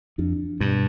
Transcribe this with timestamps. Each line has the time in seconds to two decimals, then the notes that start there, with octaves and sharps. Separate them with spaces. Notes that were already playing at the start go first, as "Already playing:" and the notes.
0.18 F2 D4
0.61 G2 B2